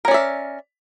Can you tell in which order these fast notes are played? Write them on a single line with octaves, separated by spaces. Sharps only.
A#4 C#4 D5 E5